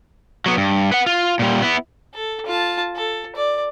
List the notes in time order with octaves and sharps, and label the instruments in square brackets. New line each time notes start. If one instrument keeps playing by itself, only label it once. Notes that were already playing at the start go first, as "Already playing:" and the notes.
[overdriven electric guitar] F#3 B3
G2
B4 F#5
F4
A#2 G3
B3 E4
[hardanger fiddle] A4
F4 A5
A4
D5